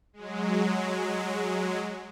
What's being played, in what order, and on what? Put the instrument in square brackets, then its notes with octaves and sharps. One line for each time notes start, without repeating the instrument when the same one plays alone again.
[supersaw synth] F#3 G#3